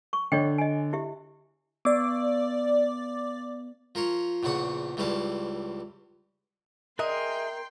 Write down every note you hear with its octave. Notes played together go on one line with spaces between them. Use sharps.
C#6
D3 C#5 D#5 G5
D#5 G#5
E4 G4 E5
B3 D5 D6
F3 A#4 C#5 C6
A#1 E2 C#3 F#5 C#6 D#6
C#2 E3 G3 C#4 C5 A5
G#4 A#4 D#5 E5 G5 C6 F#6